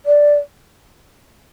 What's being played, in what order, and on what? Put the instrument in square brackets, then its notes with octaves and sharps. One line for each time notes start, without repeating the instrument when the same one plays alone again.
[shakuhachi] D5